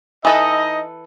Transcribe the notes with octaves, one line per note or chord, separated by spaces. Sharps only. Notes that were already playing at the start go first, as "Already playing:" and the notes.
E3 D#4 A4 B4 D#5